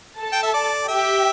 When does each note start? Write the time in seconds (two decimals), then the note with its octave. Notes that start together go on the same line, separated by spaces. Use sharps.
0.19 A4 A5
0.33 G5
0.43 E5
0.54 D5
0.88 G4 E5 G5